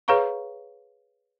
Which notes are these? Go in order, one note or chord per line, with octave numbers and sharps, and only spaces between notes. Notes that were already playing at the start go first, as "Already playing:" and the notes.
G#4 B4 C#5 F5 A#5 C#6